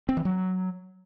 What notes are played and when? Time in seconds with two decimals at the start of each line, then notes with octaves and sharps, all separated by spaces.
0.09 C4
0.17 E3
0.25 F#3